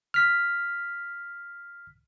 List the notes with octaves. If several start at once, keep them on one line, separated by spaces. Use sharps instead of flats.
F6 B6